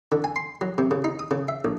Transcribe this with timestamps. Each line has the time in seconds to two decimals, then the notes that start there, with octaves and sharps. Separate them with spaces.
0.12 D3
0.24 G#5
0.36 C6
0.61 F#3
0.78 C3
0.91 C#3
1.04 D#4
1.19 D#6
1.31 C#3
1.48 E5
1.65 A#1